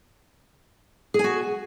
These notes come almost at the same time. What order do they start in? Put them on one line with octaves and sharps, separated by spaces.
G#4 G#5 F#4